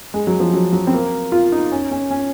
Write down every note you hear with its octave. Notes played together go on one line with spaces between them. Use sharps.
G#3
F#3
F3
F#3
F#3
C4
A#3
F4
D#4
C#4
C#4
C#4